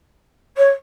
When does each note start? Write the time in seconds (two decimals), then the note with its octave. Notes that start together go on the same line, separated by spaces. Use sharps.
0.57 C#5